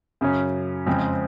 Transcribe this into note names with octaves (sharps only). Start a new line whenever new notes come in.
F#2 C#3 F#3 C#4
F2 C#3 G#3 C4